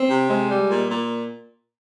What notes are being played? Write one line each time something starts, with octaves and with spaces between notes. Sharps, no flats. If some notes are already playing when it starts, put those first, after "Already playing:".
Already playing: C4
C3
G#3
G3
A#2
A#2